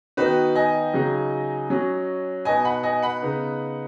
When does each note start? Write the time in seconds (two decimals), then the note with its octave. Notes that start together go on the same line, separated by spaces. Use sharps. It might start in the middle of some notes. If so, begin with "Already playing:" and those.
0.17 D#3 B3 D#4 F#4 B4
0.55 D#5 G#5
0.93 C#3 F#3 D#4
1.70 F#3 C#4
2.45 B2 B3 D#4 D#5 G#5
2.65 F#5 B5
2.83 D#5 G#5
3.02 F#5 B5
3.22 C#3 B3 D#4